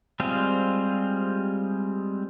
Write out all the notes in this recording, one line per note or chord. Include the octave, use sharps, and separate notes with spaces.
G3 G#3 C4 F4 G#4